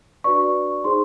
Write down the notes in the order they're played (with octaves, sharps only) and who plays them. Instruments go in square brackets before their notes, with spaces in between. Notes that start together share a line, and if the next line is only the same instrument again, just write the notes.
[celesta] D4 F#4 B4 D5 C#6
D#4 G#4 C5 C6